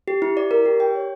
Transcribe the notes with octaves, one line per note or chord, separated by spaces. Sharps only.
G4
E4
D5
A#4
G4
G5
C#5